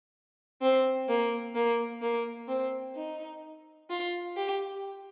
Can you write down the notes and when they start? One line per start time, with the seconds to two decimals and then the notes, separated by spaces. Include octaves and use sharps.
0.62 C4
1.09 A#3
1.55 A#3
2.02 A#3
2.49 C4
2.96 D#4
3.90 F4
4.36 G4